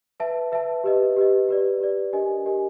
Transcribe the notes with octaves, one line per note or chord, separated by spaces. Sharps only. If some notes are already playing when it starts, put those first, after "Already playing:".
B4 E5 A5
B4 E5 A5
G4 B4 D#5
G4 B4 D#5
G4 B4 D5
G4 B4 D5
D4 G4 A#4 D#5 G#5
D4 G4 A#4 D#5 G#5